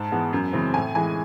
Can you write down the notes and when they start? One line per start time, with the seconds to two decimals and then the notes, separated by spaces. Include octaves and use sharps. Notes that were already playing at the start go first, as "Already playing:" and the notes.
Already playing: G#2 A5
0.12 E3 G#3 B3
0.33 F#2
0.53 C#3 E3 G#3 C4
0.74 A2 G#5
0.95 E3 G#3 G#5